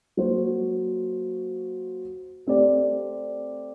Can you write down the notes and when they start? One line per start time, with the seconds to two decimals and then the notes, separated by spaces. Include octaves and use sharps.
0.17 F#3 A#3 F#4 C5
2.47 A3 C4 G4 D5